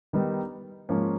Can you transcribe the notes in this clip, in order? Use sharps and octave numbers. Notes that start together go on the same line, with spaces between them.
D#3 G3 B3 D#4
G#2 F3 A#3 C#4